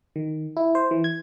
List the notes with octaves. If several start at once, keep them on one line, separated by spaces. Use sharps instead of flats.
D#3
E4
C5
E3
G#6